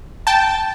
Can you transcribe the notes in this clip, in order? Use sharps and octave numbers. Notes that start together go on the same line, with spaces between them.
G5 A5